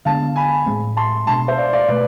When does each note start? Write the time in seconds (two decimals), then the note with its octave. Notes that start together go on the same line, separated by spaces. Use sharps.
0.05 D3 G#3 B3 D4 F5 A5
0.36 G#5 B5
0.66 A2 G#3 C4
0.97 A5 C6
1.27 B2 G#3 D4 A5 C6
1.48 C5 E5
1.58 D5 F5
1.73 D5 F5
1.88 B2 A3 B4 D5